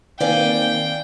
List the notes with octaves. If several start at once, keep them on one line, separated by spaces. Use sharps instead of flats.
D#3 A#3 C4 D5 F5 G5 G#5